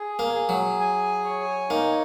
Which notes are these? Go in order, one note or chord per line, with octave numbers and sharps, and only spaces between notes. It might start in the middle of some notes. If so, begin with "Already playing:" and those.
Already playing: G#4
A#3
G#4
F#3
G#5
C#5
A#3 D#4